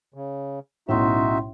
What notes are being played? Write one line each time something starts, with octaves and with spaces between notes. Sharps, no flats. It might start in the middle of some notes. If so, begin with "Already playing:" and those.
C#3
B1 A2 C#4 D#4 E4 F#4 E5 C6